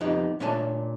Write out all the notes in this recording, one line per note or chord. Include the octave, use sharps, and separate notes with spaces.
F2 B3 D#4 G4
A#2 A3 D4 C#5 G#5 A5